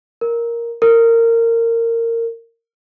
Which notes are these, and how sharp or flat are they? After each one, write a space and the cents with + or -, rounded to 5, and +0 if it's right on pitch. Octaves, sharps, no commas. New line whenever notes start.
A#4 +5
A#4 -20